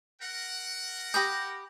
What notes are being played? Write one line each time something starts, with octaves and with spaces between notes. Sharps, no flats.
A#4 F#5
G4 B5 D#6 G6 A#6